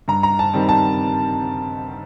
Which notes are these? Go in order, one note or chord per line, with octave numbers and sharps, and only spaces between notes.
G2 A#5
A#5
A5
D#3 G3 C4
A5